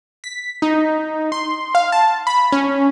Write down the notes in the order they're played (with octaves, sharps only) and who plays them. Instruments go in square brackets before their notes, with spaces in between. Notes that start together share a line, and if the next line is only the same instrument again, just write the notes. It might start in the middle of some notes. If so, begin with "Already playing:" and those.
[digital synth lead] B6
D#4
C6
F5
A5
B5
C#4